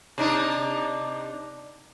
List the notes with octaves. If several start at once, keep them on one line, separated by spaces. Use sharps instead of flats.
C3 D4 D#4